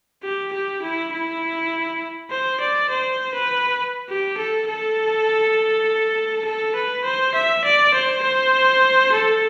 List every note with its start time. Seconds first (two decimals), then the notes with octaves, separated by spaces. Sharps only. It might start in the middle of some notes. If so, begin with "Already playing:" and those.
0.24 G4
0.53 G4
0.82 E4
1.12 E4
2.30 C5
2.61 D5
2.90 C5
3.34 B4
4.09 G4
4.38 A4
4.68 A4
6.45 A4
6.75 B4
7.04 C5
7.35 E5
7.64 D5
7.94 C5
8.23 C5
9.12 A4